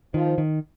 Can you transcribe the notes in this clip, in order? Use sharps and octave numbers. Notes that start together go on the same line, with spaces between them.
D#3 F3
D#3